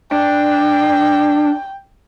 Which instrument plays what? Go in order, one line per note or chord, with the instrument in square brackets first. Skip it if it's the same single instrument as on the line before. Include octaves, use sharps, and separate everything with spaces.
[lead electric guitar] D4 [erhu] G5